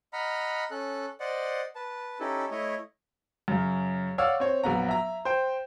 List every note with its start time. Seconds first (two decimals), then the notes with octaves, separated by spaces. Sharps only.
0.13 D#5 F#5 A#5 B5 F6
0.71 C#4 A4 F#6
1.20 C5 D5 D#5 F#5
1.75 B4 A5
2.20 C#4 D#4 E4 G4 A4
2.51 A3 E4 C#5 D#5
3.48 F#2 C#3
4.18 C#5 D5 F5 F#5 E6
4.40 C4 C#5
4.63 A#1 F#3 B3 F#5 A#5
4.89 E5 A#5
5.25 C5 G5